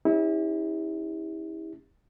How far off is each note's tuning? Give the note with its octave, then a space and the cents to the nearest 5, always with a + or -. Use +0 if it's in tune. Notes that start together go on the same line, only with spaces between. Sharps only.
C#4 +5 E4 -35 G4 +40